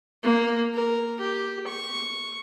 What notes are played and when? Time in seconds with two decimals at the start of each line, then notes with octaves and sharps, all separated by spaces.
0.24 A#3
0.74 A#4
1.20 G4
1.67 C#6